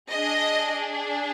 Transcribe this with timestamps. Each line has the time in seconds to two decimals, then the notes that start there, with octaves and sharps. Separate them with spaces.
0.10 G#4 D#5
0.16 D4